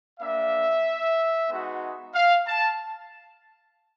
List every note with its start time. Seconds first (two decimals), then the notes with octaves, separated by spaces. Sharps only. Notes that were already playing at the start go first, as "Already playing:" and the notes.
0.19 G3 A#3 D4 E5
1.49 G#3 B3 D#4 F#4
2.14 F5
2.47 A5